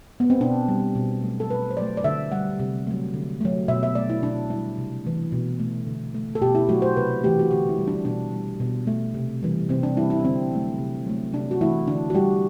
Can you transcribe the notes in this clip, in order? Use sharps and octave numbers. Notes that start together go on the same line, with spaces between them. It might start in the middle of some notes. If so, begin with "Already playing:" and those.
B3
C4
B2 D4
G3
B2
F#3 A3
A4
B2 B4
C5
F#3 A3 D5
D5
D3 E5
G3 F#5
C3
F#3 A3
D3
F#3 A3
B2 E5
E5
A3 D5
E4
B2 D4
G3 E4
C3
E3 A3
B2
A3
D3
A3
A4
B2 G4
E4
F#3 A3 F#4
C5
C3 B4
E3 A3 G4
F#4
D3 G4
E4
G3
D4
B2 D4
G3
B2
A3
C3
E3 G3
C3 C4
D4
G3 E4
E4
D4
D3 C4
F#3 A3
C3
F#3 A3
C3 D4
F#4
E3 A3 E4
D3 D4
F#4
G3 G4